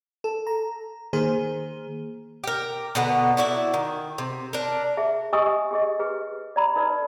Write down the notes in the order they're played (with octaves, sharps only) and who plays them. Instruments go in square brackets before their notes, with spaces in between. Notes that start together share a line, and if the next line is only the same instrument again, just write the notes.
[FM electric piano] A4
A#5
D#3 A#3 G#4 C5
[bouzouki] G4 A#4
B2 D3 B3 A#5
E4 F#4 D5 E5
D#3
C3
D4 A#4
[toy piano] G#4 E5
G4 D#5 G#5 C#6 D#6 E6
G4 G#4 D#5
G4 G#4 B4
D5 A#5 B5
D#4 A4 B4 D5